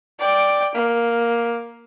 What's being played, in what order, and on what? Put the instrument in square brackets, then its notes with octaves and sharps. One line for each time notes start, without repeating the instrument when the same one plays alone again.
[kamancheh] D5 G5
A#3